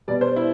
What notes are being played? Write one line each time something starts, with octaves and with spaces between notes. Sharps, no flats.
B2 G3 B3 D5
C5
E4